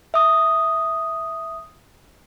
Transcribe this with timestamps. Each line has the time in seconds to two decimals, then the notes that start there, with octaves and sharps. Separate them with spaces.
0.14 E5 D#6